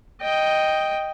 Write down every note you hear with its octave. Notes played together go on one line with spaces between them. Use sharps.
D#5 G5